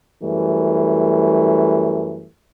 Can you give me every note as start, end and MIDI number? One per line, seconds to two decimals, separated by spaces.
0.23 2.28 42
0.23 2.28 52
0.23 2.28 55
0.23 2.28 57